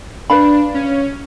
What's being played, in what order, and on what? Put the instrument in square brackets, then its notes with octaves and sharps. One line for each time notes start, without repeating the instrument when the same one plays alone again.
[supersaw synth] D4 [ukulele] B4 F5 B5
[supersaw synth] C#4